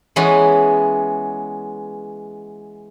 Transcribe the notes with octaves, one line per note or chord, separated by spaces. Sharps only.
E3 G#3 B3 C#4